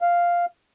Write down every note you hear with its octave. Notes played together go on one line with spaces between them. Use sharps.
F5